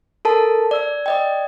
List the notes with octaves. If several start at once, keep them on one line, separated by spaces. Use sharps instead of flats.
A4 A#4 A5
D5 E6
D5 D#5 G5